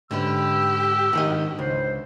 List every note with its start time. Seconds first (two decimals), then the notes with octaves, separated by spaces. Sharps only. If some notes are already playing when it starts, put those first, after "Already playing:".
0.11 G#2 D3 C#4 G4 B4 E6
1.13 G#2 D#3 D#5 F#5
1.59 C#2 C5